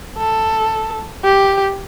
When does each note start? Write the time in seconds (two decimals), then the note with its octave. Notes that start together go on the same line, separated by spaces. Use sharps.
0.18 A4
1.24 G4